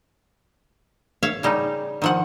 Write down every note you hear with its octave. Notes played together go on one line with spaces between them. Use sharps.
C#5 E5 F5
C#3 G3 D#4
D#3 F3 F#5